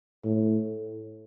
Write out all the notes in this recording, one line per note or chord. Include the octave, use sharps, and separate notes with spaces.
A2